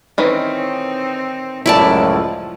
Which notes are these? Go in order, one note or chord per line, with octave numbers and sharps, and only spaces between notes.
D#3 E3 C4 C#4 D#4
C#2 F#2 A2 F3 E4 D5 A5